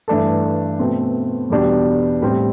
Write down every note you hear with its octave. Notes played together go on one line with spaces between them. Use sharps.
G2 E3 A3 D4 A4
B2 A3 C4
E2 B2 G3 D4 G4
A2 G3 C4